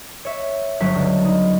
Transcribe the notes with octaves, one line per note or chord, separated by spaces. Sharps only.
C#5 E5
G1 F#3 C#6 B6
C#2 D3
D#4